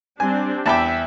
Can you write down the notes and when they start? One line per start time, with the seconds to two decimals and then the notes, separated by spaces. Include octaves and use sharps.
0.20 G3 C4 D4 G#5
0.66 E2 E5 G5 A5 B5 D6